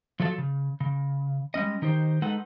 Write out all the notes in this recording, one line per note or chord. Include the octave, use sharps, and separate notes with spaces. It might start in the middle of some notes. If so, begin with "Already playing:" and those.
F3 F#3 A4 D5 A5
C#3
C#3
G3 G#3 C#4 D#5
D#3 D#4 G4 C5
G#3 D#4 A4 B4 F#5